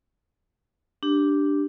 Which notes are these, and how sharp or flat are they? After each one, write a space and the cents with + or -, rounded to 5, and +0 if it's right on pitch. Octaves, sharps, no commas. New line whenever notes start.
D4 +0 G4 +0